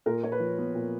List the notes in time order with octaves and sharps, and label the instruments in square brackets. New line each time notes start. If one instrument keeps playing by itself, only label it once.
[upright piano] A#2 A#4
A#2 C#5
B4
F3
B3
A#2